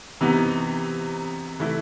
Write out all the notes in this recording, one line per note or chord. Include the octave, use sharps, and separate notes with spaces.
C3 E3 B3 D#4
E3 A3 E4